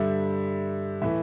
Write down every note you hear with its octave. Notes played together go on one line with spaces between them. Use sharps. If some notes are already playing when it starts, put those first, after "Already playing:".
Already playing: G2 D3 G3 E5
A2 E3 A3 E5